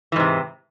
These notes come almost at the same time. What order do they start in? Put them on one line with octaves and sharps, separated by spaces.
E3 G#2 C3